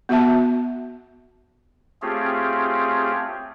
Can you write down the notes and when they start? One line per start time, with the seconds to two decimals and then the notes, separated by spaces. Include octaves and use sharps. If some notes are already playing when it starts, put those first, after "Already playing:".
0.09 B3 F#4 E5 A5
2.02 A3 C4 C#4 F4 G4 G#4